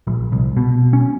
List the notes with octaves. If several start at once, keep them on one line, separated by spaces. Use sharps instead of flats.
A#1
C2
B2
C#4